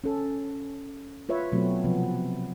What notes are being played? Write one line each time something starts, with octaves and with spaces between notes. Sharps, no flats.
C#4 A4
F4 B4 C#5 E5
B2 F#3 A3 C4
C3 F3 B3